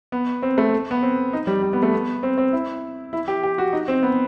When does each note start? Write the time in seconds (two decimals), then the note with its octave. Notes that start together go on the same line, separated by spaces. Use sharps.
0.12 B3
0.43 C4
0.58 A3
0.91 B3
1.02 C4
1.33 D#4
1.47 G3
1.62 G3
1.73 B3
1.83 A3
1.93 B3
2.23 C4
2.38 C4
2.53 E4
3.13 E4
3.28 G4
3.43 G4
3.58 F#4
3.73 D#4
3.88 C4
4.03 B3